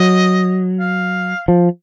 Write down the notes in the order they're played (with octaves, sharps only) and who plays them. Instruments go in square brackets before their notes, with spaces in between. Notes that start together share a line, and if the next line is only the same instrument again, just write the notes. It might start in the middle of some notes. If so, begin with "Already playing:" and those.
Already playing: [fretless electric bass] F#3 [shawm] D#5
[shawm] F5
[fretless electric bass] F3